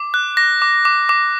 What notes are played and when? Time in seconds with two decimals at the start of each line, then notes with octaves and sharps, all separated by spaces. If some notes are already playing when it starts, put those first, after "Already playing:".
Already playing: D6
0.14 F#6
0.37 D6 A#6
0.62 D6
0.85 D6
1.09 D6